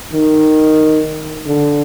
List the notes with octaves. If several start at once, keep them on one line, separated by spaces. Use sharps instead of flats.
D#3
D3